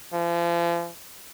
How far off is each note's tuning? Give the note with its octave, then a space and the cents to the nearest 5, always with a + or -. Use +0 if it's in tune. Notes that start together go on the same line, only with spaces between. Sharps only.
F3 -40